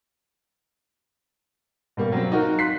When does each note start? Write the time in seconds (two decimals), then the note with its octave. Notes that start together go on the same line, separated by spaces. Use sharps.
1.97 B2 G3 A#3
2.12 F#3 G3 C4
2.32 D#4 F4 F#4 A#4
2.59 C6 F#6 B6 C7